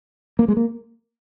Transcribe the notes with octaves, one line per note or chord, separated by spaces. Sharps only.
A#3
G#3
A#3